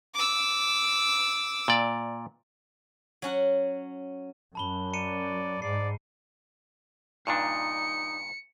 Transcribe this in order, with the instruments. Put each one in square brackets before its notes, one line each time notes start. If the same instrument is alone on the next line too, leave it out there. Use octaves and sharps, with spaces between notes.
[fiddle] D6 E6
[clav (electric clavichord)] A#2 D5
[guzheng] F#3 C#4 F#5
[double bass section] F#2 [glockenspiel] A5 B5 G7
[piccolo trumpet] D5 [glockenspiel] A#5 C#7 D#7
[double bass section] G#2 [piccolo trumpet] D5 [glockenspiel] C7
[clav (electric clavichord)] G2 A#2 D4 [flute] D#4 [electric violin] C#7